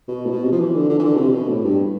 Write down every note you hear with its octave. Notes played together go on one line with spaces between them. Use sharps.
B2
A2
B2
C3
F3
E3
D3
D3
E3
D3
B2
C3
B2
A2
G2